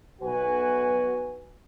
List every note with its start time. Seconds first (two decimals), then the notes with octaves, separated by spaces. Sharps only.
0.22 B1 F#4 B4 G#5